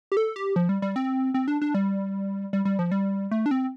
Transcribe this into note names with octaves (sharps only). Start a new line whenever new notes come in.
G4
A4
G4
F3
G3
G3
C4
C4
D4
D4
G3
G3
G3
F3
G3
A3
D4
C4